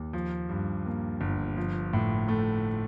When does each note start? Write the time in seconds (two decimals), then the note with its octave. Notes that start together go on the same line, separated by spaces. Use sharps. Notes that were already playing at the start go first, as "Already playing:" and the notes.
Already playing: D#2
0.13 F3
0.49 G2
0.86 A#3
1.21 G1
1.57 F3
1.93 A2
2.28 A3